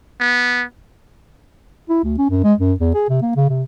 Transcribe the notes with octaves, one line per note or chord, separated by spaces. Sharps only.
B3
E4
D2
C#4
F#2
G#3
F#2
E2
G#4
C3
A#3
C#3
C3